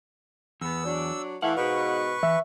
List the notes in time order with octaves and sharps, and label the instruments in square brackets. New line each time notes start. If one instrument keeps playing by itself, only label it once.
[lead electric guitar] E2 [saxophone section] B3 [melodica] E6
[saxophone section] F#3 D4
[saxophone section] E3 [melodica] A3 [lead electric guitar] F5 F#5
[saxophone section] G#2 B2 [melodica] B4 C#6
[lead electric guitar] E3 [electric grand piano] E5